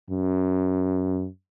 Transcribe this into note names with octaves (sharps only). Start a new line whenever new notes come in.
F#2